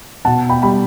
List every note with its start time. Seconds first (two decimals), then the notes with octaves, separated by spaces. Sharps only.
0.25 B2 F#5 A5
0.49 G5 B5
0.63 G3 B5